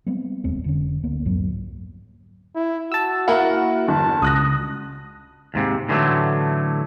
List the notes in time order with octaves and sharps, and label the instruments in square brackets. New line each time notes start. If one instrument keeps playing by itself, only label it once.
[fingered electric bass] G3 G#3 B3 C4
E1 D#2 G#3 C4
F1 D3 C#4
D2 A#3 B3
C2 F2 G#2 F#3
[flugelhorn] E4
[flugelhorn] F#4 [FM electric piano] A5 E6
[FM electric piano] A#3 E4 [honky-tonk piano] A#4 F#5
[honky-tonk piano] G1 E2 [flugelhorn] A5
[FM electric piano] C#2 [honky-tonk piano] D#6 F#6 A#6
[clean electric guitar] D#2 G#2 C3
A2 D3 E3 F#3 A3